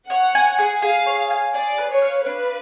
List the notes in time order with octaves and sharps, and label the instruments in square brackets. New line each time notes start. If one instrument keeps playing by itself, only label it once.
[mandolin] C#5 [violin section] F#5
[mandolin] G#5
G#4
[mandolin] G#4 [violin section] F5
[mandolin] C#5
G#5
[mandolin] G#4 [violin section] D5
[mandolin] B4
[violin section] C#5
[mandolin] F5
[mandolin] D4 [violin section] B4